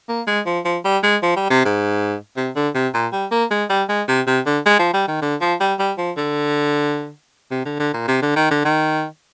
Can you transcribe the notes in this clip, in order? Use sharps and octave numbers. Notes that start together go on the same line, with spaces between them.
A#3
G#3
F3
F3
G3
G#3
F3
G3
C3
G#2
C3
D3
C3
A#2
G3
A#3
G#3
G3
G#3
C3
C3
D3
G#3
F3
G3
D#3
D3
F3
G3
G3
F3
D3
C3
D3
D3
A#2
C3
D3
D#3
D3
D#3